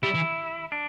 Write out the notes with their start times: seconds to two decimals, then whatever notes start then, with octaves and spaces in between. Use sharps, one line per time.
0.03 G3 E4
0.14 E3
0.72 D4